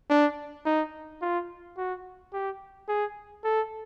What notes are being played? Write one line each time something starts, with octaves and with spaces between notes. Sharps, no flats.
D4
D#4
F4
F#4
G4
G#4
A4